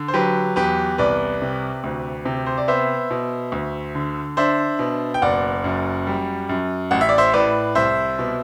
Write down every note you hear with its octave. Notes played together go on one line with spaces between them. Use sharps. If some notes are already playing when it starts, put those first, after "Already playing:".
Already playing: D3
C5
F#3 G4 B4
E2 G4 B4
C2 B4 D5
C3
D2
C3
C5
D5
B3 C5 E5
B2
D2
D3
D4 C5 E5
B2
G5
F#1 D5 F#5
F#2
G3
F#2
A1 F#5
E5
D5
C5 E5
A2 B4 D5
C2 C5 E5
B2